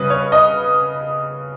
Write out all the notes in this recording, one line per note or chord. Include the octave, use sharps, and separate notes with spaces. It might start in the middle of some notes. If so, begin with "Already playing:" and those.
Already playing: C#3 G3 C#4 B4 D#5
C#5
D#5